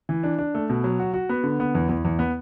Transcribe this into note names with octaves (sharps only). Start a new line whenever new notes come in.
E3
D4
D4
A3
B2
F#3
F#4
F#4
B3
D3
B3
E2
E2
E2
B3